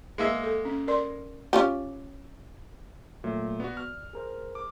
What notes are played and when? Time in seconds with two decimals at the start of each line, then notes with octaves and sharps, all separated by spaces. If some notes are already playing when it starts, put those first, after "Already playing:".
0.18 G#3 A#3 E5
0.44 A4
0.65 C#4
0.88 A#4 D5 C6
1.53 C#4 F4 G4
3.24 A#2 F#3 A3
3.60 B3 F#4 D5
3.77 F6
4.13 G#4 A#4 C5
4.55 D6